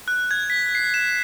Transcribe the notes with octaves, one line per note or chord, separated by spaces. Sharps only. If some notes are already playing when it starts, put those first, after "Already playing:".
F#6
G#6
B6
C7
E7